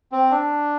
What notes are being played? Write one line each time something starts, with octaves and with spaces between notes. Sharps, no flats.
C4
D4